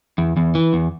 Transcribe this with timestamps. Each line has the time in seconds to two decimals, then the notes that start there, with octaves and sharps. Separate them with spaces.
0.18 E2
0.37 E2
0.55 E3
0.73 E2